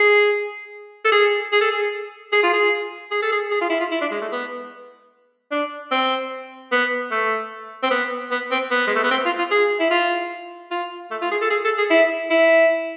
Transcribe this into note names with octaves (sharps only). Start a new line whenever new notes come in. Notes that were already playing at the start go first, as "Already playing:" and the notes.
Already playing: G#4
A4
G#4
G#4
A4
G#4
G#4
F4
G#4
G#4
A4
G#4
G#4
F4
E4
F4
E4
D4
G#3
A3
B3
D4
C4
B3
A3
C4
B3
B3
C4
B3
G#3
A3
B3
C4
F4
F4
G#4
E4
F4
F4
A3
F4
G#4
A4
G#4
A4
G#4
E4
E4